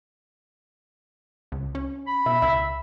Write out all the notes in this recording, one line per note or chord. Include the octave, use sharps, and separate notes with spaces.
C#2
C#4
B5
B2 E5
C#2 E5